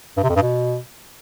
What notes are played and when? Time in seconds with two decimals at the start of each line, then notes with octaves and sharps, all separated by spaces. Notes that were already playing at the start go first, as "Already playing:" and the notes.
0.17 G2
0.23 C3
0.29 F2
0.36 G2
0.42 B2